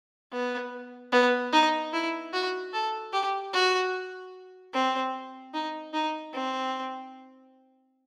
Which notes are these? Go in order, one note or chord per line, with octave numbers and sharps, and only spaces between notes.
B3
B3
D#4
E4
F#4
A4
G4
F#4
C4
D#4
D#4
C4